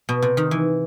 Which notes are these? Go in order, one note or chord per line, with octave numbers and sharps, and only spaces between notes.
B2
C3
D#3
E3